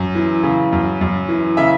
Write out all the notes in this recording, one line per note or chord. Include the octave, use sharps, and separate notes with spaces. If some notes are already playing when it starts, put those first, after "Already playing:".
Already playing: F#2
E3
C#3
F#2
F#2
E3
C#3 E5